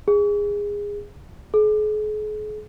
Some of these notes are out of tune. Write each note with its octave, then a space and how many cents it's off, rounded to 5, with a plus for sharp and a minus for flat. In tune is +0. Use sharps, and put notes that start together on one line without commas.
G#4 -20
G#4 +40